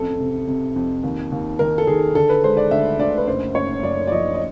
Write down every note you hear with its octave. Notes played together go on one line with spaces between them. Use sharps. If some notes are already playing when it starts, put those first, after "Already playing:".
Already playing: A1 F2 A4
C3
C3
F2
D#2
D#2
D#3 A#4
A4
D#3 G#4
D3 A4
B4
G#3 C5
D5
D2 E5
D2 D5
B4
F#1 C5
F#1 C#5
F#2 D5
D5
F3 D#5
D#5